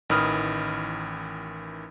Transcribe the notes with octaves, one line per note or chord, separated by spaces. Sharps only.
A1 D#3 E3 B5 D#6 F6